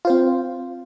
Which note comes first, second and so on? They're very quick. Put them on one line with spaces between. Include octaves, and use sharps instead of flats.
F4 C5 C4